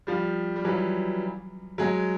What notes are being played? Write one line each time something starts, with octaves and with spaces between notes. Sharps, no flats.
F3 G3
G3
E3 F#3
F#3 G#3